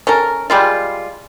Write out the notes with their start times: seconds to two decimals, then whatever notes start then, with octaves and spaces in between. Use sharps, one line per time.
0.07 C#4 A4 A#4
0.50 G3 G#3 F4